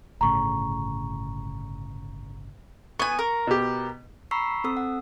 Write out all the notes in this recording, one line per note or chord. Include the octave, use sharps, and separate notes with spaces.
G1 A2 C#3 A#5 C#6
B3 G#5 C#6
A#4
B2 G4
A#5 B5 C#6 E6 B6 C7
C4 A4 E6
F#5